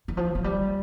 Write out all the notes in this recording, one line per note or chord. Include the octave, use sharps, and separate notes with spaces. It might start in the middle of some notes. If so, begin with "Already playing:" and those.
E3
F3
F#3
G3